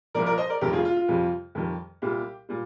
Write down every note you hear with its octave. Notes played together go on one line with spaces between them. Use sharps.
C2 A#2 F3 A#4 D5
A#4 D5
C5 D#5
A#4 D5
F1 F2 C3 D#3 G3 G4 A#4
F4 G#4
F4
F4
F2 C3 G3
F2 D#3 G3
C2 A#2 G3 G4
A#2 G3